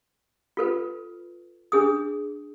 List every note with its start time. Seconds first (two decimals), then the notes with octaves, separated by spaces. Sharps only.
0.57 F4 A4 B4
1.72 D4 G#4 D#6